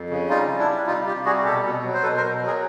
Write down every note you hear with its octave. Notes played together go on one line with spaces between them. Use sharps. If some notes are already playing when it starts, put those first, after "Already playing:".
Already playing: F2
C#3
G3 D#4 F4
G3
D4 E4
G3
C3 D#4 F4
C3 F4 G4
G3 F#4 G#4
B2 G4 A4
B2
F#3
C5
B2 A4 B4
A#4 C5
B2
F#3 G#4 A#4